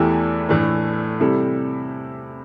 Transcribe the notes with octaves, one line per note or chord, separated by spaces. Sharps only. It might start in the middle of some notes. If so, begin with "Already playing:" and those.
Already playing: E2 E3 A3 E4 G4
A2 E3 A3 D4
C3 G3 E4 A4